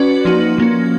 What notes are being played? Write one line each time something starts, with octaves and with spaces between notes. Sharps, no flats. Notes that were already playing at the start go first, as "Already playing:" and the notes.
Already playing: C#4 F#4 B4 D5
F3 A#3 D#4 F#4
F3 A#3 C#4